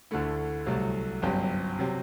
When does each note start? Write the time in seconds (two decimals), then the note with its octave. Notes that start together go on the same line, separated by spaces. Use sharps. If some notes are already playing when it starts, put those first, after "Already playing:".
0.11 D2 D3 A3 E4
0.66 C2 C3 F#3 A3
1.22 G1 F#2 F#3 C4 G4
1.79 C3 F#3 C4